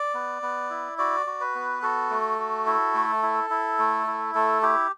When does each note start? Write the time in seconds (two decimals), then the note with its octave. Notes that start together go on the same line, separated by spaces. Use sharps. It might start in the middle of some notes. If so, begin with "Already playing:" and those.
Already playing: D5
0.14 B3
0.42 B3
0.70 E4
0.98 F#4 D5
1.26 F#4
1.40 B4
1.55 B3
1.82 F#4 A4
2.10 A3
2.39 F#4
2.66 E4
2.94 A3
3.23 E4
3.50 E4
3.79 A3
4.07 E4
4.35 A3 A4
4.62 E4 G4